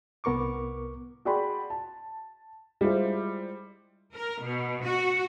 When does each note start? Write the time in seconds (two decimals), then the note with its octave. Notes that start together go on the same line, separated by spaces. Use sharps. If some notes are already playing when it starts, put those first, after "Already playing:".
0.24 C2 B3 A#4 C#6 D6
1.25 F#4 G#4 D5 G5 B5 C6
1.70 A5
2.81 G3 G#3 E4 F4 C5
4.14 A#4
4.42 B2
4.84 F#4